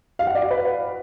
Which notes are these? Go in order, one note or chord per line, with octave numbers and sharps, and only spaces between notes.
F5
F#5
D5
F#4
B4